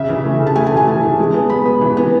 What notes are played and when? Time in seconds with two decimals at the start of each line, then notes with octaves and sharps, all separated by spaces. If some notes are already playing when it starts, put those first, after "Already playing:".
Already playing: C#3 E5
0.09 E3
0.24 A3
0.40 C#3
0.47 A5
0.55 A3 G#5
0.67 G#5
0.71 E3
0.77 G#5
0.87 A3 A5
1.03 E3
1.19 G#3
1.34 B3
1.50 B3 B5
1.65 B3
1.81 E3
1.97 B3